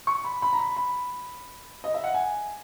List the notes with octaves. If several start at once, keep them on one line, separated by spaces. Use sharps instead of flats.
C#6
B5
B5
A#5
B5
B5
D#5
E5
F#5
G#5